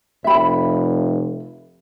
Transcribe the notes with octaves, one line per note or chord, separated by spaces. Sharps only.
F1 E5 B5